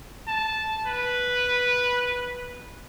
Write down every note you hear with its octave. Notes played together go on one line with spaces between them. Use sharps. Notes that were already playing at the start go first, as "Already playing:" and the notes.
A5
B4